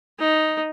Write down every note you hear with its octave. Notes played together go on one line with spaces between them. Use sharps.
D#4